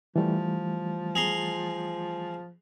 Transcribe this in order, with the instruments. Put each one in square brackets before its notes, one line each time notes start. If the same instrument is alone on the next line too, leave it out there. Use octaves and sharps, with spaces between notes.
[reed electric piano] E3 G3 A3 [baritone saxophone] F3
[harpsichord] G#4 A#5 C6